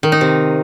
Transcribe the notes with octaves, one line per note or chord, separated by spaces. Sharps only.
D#3
D#4
C3